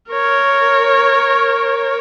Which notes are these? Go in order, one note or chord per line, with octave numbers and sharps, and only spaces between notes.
A#4 C#5